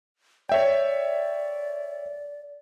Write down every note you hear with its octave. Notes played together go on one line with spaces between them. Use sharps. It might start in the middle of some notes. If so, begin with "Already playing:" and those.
C#5 D5 E5 G5